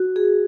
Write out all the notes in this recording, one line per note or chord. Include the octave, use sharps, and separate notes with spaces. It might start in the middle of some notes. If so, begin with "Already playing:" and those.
Already playing: F#4
G#4